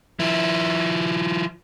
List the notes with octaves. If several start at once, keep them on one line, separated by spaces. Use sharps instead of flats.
F3 E4